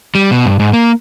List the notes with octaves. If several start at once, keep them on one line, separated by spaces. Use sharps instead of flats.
G3
B2
G2
G#2
A#3